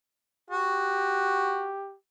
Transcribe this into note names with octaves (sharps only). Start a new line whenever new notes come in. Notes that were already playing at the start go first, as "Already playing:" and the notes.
F#4 G4